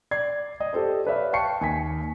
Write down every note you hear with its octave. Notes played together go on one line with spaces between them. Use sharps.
D5 G#6 C7
D5 D#5 D#6
G4 A4 C5 D5
B4 C#5 D5 E5 F5
F5 G5 A5 C#6 C7 C#7
D#2 G#5 B6